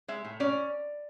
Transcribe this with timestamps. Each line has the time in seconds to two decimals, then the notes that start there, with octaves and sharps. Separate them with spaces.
0.08 G#3 E5
0.24 A2
0.40 C#4 D5